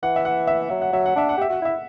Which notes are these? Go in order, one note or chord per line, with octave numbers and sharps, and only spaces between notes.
E3 F#5
E5
F#5
E5
F#3 E5
F#5
F#3 E5
F#5
D4 E5
F#5
G4 E5
F#4 F#5
E4 E5